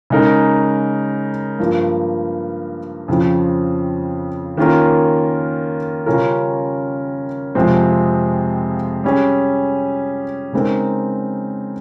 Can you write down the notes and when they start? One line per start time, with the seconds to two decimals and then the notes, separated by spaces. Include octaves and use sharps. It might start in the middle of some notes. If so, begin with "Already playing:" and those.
0.10 C#3 G#3 D#4 A#4
1.59 G2 F3 A#3
3.08 F2 C#3 F3 C4
4.57 D#3 A#3 C#4 F4 A#4
6.06 C#3 G3 C#4 F4 A#4
7.55 F2 C3 F3 G#3 C4
9.04 G3 C#4 G#4
10.53 C#3 G#3 C4 D#4 A#4